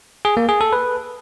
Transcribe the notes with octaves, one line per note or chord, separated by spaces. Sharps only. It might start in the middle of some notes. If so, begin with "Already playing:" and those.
G#4
A#3
G#4
A4
B4